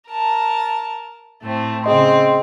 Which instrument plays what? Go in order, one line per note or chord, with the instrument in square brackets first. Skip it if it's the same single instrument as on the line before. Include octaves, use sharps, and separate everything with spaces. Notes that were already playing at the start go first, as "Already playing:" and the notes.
[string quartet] A#4 A5
A2 A3 C4
[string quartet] C#3 C4 [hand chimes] G#4 D#5 C6